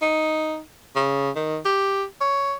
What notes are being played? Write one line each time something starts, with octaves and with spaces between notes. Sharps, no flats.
D#4
C#3
D#3
G4
C#5